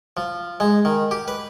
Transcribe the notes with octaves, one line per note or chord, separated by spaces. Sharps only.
F3
G#3
D#3
G4
B4